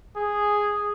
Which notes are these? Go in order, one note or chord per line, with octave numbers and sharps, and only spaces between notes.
G#4